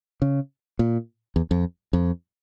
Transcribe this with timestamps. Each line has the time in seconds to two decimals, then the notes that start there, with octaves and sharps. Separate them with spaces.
0.22 C#3
0.79 A#2
1.36 E2
1.51 F2
1.93 F2